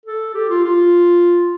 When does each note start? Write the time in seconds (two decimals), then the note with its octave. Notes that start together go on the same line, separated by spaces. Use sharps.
0.06 A4
0.34 G4
0.49 F4
0.64 F4